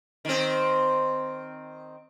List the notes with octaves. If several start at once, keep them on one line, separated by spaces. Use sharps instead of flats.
D#3 C4